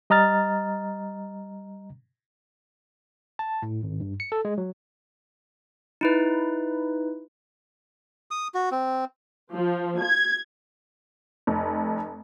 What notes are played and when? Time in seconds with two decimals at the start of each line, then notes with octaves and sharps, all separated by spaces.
0.10 G3 D#5 A#5 F6 A6
3.39 A5
3.62 A2
3.83 G#1
4.00 G2
4.20 C#7
4.32 A4
4.45 G#3
4.58 F#3
6.01 D#4 E4 B4
8.31 D#6
8.54 F#4
8.72 C4
9.55 F3
10.01 G#6
11.47 F1